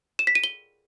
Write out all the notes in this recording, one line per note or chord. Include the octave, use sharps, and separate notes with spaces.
E7
B6
D#7
G7